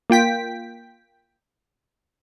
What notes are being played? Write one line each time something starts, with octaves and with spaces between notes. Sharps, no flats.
A#3 F4 G5 B6